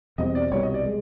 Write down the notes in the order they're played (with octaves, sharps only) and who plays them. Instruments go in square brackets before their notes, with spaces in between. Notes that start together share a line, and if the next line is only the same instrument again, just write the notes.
[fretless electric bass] E2 B2 G3 C4 [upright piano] D#5
[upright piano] D5
[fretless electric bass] C2 B2 G3 [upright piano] C#5
[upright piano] D#5
D5
[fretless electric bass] G#3